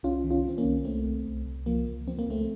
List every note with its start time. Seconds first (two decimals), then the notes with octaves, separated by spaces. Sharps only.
0.03 C2 C#4 F4
0.24 D#3
0.30 C#4 F4
0.45 D#3 C4
0.58 A#3 C#4
0.64 C2
0.85 C2 A3 C4
1.06 C2
1.26 C2
1.46 C2
1.66 F3 A#3
1.87 C#2
2.07 F3 C4
2.19 A#3
2.27 C#2 A3 C4